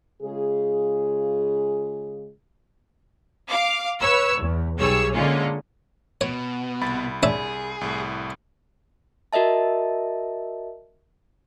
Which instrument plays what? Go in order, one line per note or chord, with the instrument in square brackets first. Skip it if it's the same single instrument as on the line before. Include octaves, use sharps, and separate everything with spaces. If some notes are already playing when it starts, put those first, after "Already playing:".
[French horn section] C#3 G#3 F4 G#4
[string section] F5 D6
B4 C#5 E6
E2
B1 G3 G#4 C#5 E6
D3 G#3 A#3 C#4 F4
[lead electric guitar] B2 [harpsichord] C#5
[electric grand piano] C2 B5 A6
[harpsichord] D4 C#5 E5 [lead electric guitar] G#4
[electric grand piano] C2 A2
[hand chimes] F#4 A#4 D#5 E5 A5